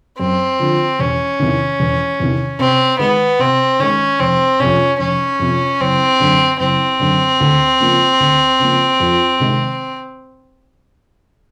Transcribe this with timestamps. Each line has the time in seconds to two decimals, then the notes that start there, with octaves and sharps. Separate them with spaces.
0.20 F#2 C4
0.60 D3 F3
0.99 E1 C#4
1.39 E2 C3 D#3
1.80 E1
2.20 E2 C3 D#3
2.59 C3 C4
2.99 D#3 G#3 B3
3.40 C3 C4
3.80 D#3 G#3 C#4
4.20 F1 C4
4.60 F2 C3 C#4
5.00 F1 C#4
5.39 F2 C3
5.80 F#1 C4
6.20 F#2 D3
6.60 F#1 C4
7.00 F#2 D3
7.40 D2
7.80 C#3 F3 A#3
8.20 D2
8.60 C#3 F3 A#3
9.00 F2
9.40 C3 D#3 G#3